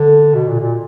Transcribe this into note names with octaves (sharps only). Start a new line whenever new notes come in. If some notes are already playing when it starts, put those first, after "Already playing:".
Already playing: D3
B2
A#2
A#2